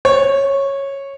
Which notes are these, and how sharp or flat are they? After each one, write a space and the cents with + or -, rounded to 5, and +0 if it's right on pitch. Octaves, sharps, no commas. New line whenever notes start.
C#5 -10